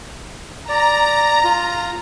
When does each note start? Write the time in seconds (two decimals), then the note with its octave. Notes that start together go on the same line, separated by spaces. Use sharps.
0.69 D5 A#5
1.44 F4